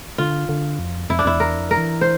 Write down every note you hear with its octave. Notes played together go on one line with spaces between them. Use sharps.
D3 F4
D3
F2
F2 E4
D4
F2 E4
E2
A#4
F2
A#4
E3
C5